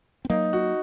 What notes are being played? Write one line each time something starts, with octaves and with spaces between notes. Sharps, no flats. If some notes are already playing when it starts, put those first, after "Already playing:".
C4
F#3 A#3 D#4
F#4